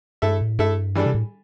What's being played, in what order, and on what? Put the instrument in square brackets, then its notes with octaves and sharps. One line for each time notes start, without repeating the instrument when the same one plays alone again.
[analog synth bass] G2 [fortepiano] A3 E4 A4 E5
[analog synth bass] A2
[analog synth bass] G2 [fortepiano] A3 E4 A4 E5
[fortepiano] E3 G3 D4 A4
[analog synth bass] C3
A2